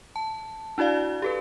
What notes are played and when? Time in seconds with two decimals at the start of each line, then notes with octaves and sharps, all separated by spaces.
0.16 A5
0.78 D4 E4 F#4 D5 F5
1.22 G4 A4 B4